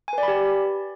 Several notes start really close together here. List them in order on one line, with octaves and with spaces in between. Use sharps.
G#5 B4 D5 B5 G4